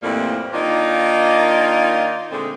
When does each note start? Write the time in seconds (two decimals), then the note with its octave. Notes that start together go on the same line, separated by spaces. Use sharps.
0.03 F2 A2 E3 G3 A#3 C4
0.53 D#3 A#3 D4 D#4 F4
2.31 A#2 D3 G#3 A3 C4